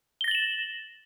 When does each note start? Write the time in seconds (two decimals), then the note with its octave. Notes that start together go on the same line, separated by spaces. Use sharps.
0.21 G7
0.24 A#6
0.28 A6
0.31 F#7
0.35 E7